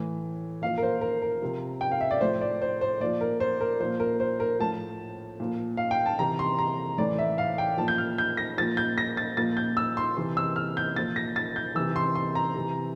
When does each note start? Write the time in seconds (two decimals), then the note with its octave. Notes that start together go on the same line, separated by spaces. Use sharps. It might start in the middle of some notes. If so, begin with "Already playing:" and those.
Already playing: A2 E3
0.62 A#2 F3 F5
0.78 A#4
0.83 C5
1.01 A#4
1.22 A#4
1.42 C3 F3
1.81 G5
1.91 F5
2.01 E5
2.11 D5
2.21 A2 F3 C5
2.41 D5
2.62 C5
2.81 C5
3.00 A#2 F3 D5
3.21 A#4
3.40 C5
3.61 A#4
3.80 A#2 F3 C5
4.00 A#4
4.20 C5
4.40 A#4
4.59 A2 F3 A5
5.40 A#2 F3
5.77 F5
5.91 G5
6.06 A5
6.19 C3 E3 A#5
6.39 C6
6.58 A#5
6.98 A2 E3 D5
7.18 E5
7.38 F5
7.58 G5
7.77 A#2 F3 A5
7.88 G6
7.98 F6
8.18 G6
8.37 A#6
8.58 A#2 F3 A6
8.77 G6
8.98 A#6
9.17 A6
9.37 A#2 F3 A6
9.57 G6
9.77 E6
9.97 C6
10.17 C3 E3 C6
10.37 E6
10.56 F6
10.77 G6
10.96 A#2 F3 A6
11.16 A#6
11.36 A6
11.56 G6
11.75 C3 E3 E6
11.96 C6
12.15 C6
12.35 A#5
12.56 C3 E3